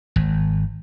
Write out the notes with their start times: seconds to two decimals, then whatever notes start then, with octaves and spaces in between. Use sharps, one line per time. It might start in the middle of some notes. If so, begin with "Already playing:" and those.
0.16 G#1